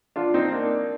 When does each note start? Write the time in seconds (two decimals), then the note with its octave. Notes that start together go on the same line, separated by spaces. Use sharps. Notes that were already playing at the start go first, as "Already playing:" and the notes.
0.16 D4 F4
0.34 C4 D#4
0.52 A#3 D4